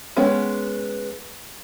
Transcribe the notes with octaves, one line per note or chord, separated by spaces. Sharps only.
G#3 B3 C#4